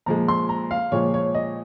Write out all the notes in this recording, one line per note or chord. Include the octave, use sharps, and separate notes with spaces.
A#2 F3 G#3 A#5
C6
A#5
F5
A#2 F3 G#3 C#5
C#5
D#5